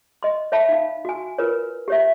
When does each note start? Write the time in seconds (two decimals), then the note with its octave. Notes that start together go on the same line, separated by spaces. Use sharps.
0.23 D#5 C6
0.52 C#5 E5 A5 B5
0.69 D#4 F5
1.05 F#4 G#5
1.38 F4 A#4 B4 C#5
1.88 G4 C#5 E5